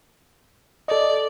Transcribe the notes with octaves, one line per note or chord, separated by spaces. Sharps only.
A4 D5 D#5